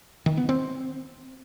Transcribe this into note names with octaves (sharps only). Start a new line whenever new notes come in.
D#3
B3
C4